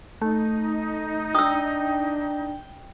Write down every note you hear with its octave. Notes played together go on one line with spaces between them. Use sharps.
A3 D#4
D4 G5 D#6 E6